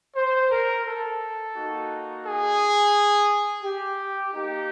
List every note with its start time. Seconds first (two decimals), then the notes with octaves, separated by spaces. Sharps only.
0.16 C5
0.50 A#4
0.85 A4
1.55 A#3 D#4 F#4
2.25 G#4
3.63 G4
4.33 A#3 D#4 G4